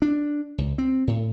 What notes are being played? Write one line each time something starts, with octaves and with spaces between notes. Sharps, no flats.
D4
C#2
C4
A2